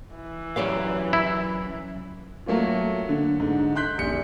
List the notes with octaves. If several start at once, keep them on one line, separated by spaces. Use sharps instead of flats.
E3
F#2 G4 B4 C#5 D5 F5
E4
F#3 A3 A#3 C#4 F4
D3
G#2 D3
C6 F#6 G6 B6
D#1 A#1 C#7